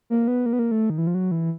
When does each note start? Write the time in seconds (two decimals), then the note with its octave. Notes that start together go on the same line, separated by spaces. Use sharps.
0.10 A#3
0.28 B3
0.46 A#3
0.53 B3
0.59 A#3
0.71 A3
0.90 D#3
0.98 E3
1.07 F3
1.14 F#3
1.31 E3